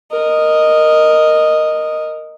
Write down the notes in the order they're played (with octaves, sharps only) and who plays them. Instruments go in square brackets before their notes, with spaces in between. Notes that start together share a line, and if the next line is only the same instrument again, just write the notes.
[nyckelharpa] A#4 D#5